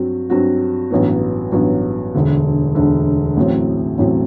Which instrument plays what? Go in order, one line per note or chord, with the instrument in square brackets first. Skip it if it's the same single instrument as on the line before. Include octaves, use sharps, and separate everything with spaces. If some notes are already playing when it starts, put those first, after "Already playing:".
Already playing: [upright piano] G2 F#3 C4 F#4
G2 F#3 C4 F#4
A1 G2 F#3 B3
A1 G2 F#3 B3
E1 D2 D3
E1 D2 D3
A1 A2 F#3 C4
A1 A2 F#3 C4